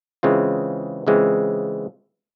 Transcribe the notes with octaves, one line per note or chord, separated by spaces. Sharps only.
C#3 E3 G#3 C4 F4
C#3 E3 G#3 C4 F4